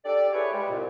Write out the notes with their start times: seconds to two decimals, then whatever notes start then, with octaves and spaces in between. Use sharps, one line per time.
0.05 D4 G4 A4 D5
0.33 E4 G4 G#4 B4 C#5
0.52 G3 G#3
0.69 C2 A#2